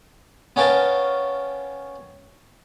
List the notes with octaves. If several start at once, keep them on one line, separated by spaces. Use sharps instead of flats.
B3 C#4 A#4 F5 G5 A5